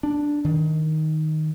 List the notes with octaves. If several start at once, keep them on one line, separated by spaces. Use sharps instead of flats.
D4
D#3